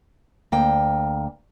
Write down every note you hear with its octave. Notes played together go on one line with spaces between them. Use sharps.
D2 A#3 G5